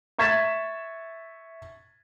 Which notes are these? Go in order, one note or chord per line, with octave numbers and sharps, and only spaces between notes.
E5 C#6 G#6 A6 B6 E7